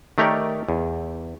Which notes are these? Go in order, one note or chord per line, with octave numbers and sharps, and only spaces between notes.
D#3 A3 G4 A#4 C#5 D5
E2